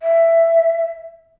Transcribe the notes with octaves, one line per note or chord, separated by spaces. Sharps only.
E5